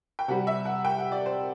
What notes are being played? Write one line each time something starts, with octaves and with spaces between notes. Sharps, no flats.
G5
C3 G3 C4 F#5
E5
F#5
G5
F#5
D5
C5